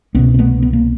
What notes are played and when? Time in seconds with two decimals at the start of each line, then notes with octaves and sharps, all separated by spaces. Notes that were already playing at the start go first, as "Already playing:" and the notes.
0.15 C2 B2 B3 C#4
0.34 C4
0.39 A3 B3
0.62 B3
0.73 A#3